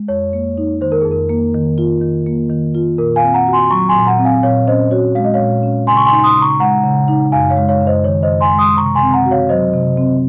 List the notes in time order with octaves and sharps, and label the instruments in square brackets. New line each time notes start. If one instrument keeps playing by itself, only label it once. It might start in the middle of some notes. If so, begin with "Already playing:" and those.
Already playing: [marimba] G#3
[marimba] F2 [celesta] C#5
[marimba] A#3
D#4
[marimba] D#3 [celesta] C5
[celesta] A#4
[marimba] F2 [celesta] G#4
[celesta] A#4
[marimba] A#3
D#3
F4
D#3
A#3
D#3
F4
[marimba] A#2 [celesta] A#4
[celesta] F5 G#5
[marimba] C4
[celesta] F#5 A#5
[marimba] F#4
[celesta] G#5 C6
[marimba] F#3 [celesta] A#5 C#6
[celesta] G#5 C6
[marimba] A#2
[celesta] F#5 A#5
[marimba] C4
[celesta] F5 G#5
[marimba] A#2 [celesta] C#5 F5
[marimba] C#4 [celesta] C5 D#5
[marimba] F#4 [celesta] C#5
[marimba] G#3 [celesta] F5
[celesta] D#5
C#5 F5
[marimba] A#2
C#4
[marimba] C#3 [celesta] G#5 C6
[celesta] C#6
G#5 C6
[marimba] D#4
[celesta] C6 D#6
[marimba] C#3
[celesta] A#5 C#6
[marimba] G#3 [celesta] F#5 A#5
[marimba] C#3
D#4
[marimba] F#2 [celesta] F5 G#5
[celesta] C#5 F5
[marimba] G#3
[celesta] C#5 F5
[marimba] F#2
[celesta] C5 D#5
[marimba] D#3 [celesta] C#5
[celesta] C5 D#5
[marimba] F#2
[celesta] G#5 C6
[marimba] G#3
[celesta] C6 D#6
[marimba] C3 [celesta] A#5 C#6
[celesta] G#5 C6
[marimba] C4
[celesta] F#5 A#5
[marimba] F#4
[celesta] C#5 F5
[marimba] F#3 [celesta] C5 D#5
[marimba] C3
C4